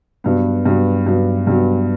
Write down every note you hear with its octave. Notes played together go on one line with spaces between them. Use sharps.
G2 F#3 B3
G2 F#3 B3
G2 F#3 B3
G2 F#3 B3